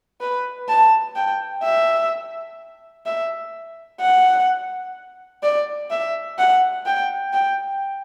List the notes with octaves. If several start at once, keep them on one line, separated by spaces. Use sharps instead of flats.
B4
A5
G5
E5
E5
F#5
D5
E5
F#5
G5
G5